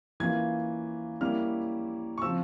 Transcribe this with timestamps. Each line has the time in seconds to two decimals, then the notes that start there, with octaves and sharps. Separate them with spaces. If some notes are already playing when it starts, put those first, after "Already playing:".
0.20 E3 A#3 C#4 F4 G#6
1.21 G3 A#3 C#4 E4 F6
2.18 C#6
2.22 C#3 F3 C4 F4 E6